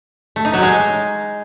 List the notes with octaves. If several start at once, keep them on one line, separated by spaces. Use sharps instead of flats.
A3
D#4
F#3
G#3